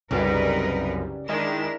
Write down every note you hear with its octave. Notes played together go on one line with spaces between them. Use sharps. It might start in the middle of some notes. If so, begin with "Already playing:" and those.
C2 F#2 C#3 G3 C#4 D#4 A#4 B4
D#3 G#3 D4 E4 A#4 E7